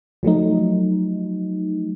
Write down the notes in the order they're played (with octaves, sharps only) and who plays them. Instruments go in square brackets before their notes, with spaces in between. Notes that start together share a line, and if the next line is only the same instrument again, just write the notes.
[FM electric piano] F3 F#3 A3 D#4